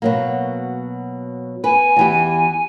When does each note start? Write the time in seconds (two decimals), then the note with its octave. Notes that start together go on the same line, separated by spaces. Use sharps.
0.02 B2 F#3 A#3
1.64 B4 G#5
1.96 E2 E3 G4